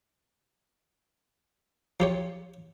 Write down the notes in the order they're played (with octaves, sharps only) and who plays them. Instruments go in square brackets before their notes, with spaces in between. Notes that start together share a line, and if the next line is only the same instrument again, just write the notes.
[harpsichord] F3 G4 C#5